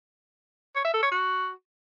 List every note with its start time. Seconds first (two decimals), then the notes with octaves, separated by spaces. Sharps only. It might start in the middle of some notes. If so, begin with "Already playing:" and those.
0.75 C#5
0.84 E5
0.94 A4
1.03 C#5
1.12 F#4